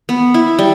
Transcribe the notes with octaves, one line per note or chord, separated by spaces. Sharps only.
B3
E4
G3